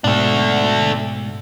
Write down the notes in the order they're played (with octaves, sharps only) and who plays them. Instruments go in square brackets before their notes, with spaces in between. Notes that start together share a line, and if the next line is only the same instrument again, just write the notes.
[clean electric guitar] G#2 B2 [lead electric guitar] A3 D4